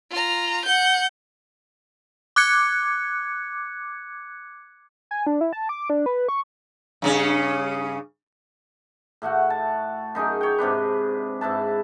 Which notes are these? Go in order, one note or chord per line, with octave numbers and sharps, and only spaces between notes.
F4 A#5
F#5 G6
D6 F#6 G#6 C#7
G#5
D4
E4
A5
D6
D4
B4
C#6
G2 C#3 C#4
A2 A3 F#4 F#5
A5
F#2 D#4 G#4 A#4
C#5 G5
G#2 C3 D4 B4
G#2 E4 B4 A5